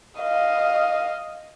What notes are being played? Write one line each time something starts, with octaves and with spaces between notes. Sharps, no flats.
D#5 F5